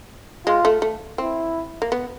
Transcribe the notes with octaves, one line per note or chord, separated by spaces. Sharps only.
G#3 F4
A3
A3
C4 E4
A#3
B3